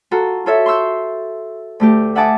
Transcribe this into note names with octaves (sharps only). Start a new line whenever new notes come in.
F4 F#4 A4 A#5
F4 A4 C#5 E5
C6 C#6 E6 G6
D2 A3 G4
E5 F#5 G#5 A5 D6 D#6